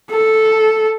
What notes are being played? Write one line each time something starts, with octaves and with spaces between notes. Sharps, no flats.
A4